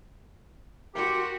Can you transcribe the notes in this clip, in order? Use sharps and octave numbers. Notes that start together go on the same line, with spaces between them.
F#4 G4 A#4 C6